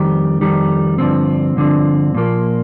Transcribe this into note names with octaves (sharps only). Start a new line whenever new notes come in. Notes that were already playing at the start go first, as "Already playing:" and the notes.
Already playing: F2 D#3 G3
F2 D#3 G3
G2 D3 F3 C4
G2 D3 F3 C4
A#2 F3 A#3